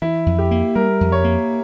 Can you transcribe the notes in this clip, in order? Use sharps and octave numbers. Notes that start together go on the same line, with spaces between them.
E3 E4
F2
G4
A#3
G3 A#4
F2
C#5
A#3